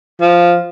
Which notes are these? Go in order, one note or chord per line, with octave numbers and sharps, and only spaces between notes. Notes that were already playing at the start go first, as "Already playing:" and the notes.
F3